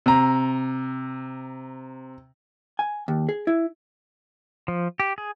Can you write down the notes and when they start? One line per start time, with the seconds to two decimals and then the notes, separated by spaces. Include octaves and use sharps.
0.06 C3 A#5
2.79 G#5
3.08 D#2
3.29 G#4
3.47 E4
4.68 F3
5.00 G4
5.18 G#4